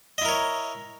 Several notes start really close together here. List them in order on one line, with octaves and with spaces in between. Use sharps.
D#5 E4 A#4 C#5